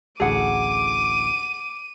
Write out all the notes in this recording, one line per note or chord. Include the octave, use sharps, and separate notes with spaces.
A1 D2 G#4 A4 F#5 D6 D#7